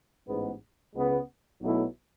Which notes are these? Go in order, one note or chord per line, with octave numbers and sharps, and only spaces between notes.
A1 G#2 G#3 B3
C#2 C#3 G#3 B3
B1 B2 F#3 A3 E4